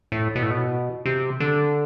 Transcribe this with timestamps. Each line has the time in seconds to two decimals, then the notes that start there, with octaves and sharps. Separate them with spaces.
0.12 A2
0.35 B2
0.43 A2
0.50 B2
1.06 C3
1.40 D3